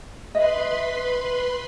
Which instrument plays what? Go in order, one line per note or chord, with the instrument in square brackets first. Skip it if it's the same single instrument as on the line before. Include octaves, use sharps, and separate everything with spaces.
[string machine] B4 B5 C6 [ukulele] D#5 E5